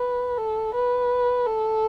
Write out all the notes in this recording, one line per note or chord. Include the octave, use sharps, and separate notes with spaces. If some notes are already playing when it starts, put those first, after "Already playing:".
Already playing: B4
A4
B4
A4